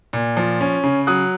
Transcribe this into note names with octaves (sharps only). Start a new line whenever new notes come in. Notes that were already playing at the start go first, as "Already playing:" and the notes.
A#2
F3
C#4
C#3
F#3 D#6 F#6